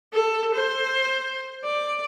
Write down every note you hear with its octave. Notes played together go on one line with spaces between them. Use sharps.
A4
C5
D5